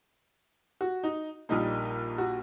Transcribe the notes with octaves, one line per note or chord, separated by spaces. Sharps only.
F#4
D#4
A#1 A#2 G3 A#3 D#4
F#4